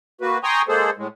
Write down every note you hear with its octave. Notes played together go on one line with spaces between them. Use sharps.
A#3 F#4 B4
G5 G#5 A#5 C6 C#6 D#6
G#3 A#3 G#4 A4 C5
A2 G#3